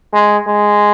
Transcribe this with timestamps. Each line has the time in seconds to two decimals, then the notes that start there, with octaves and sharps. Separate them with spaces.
0.13 G#3
0.47 G#3